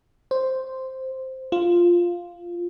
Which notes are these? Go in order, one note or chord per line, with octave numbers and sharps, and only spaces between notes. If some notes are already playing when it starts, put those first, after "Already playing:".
C5
F4